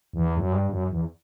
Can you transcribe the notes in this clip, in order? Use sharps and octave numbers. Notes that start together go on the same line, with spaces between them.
E2
F#2
G2
F#2
E2